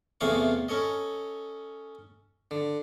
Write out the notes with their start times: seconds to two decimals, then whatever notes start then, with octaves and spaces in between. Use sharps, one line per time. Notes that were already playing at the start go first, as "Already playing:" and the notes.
0.21 E2 C3 A3 G#4 F5 C#6
0.68 C#4 A4 C#5 D#5
2.51 D3